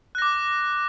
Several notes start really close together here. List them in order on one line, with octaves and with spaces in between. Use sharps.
F#6 A#6 D6